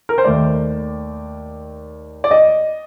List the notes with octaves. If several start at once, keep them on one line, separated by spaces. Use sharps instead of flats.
A#4
C5
D#2 D#3 A3 D5
D5
D#5